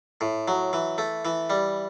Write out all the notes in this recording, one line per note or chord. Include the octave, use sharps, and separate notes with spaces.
A2
F#3
E3
A3
E3
G3